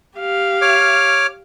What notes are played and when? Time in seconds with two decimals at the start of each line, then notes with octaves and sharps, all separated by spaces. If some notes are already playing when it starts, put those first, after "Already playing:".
0.19 G4 F5
0.62 C#5 D6 F6